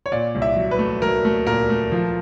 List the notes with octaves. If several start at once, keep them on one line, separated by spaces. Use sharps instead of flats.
C#5
A#2 D5
C2
E5
F#3
B4
A3
F#3 A#4
A3
A#2 A#4
A3
F3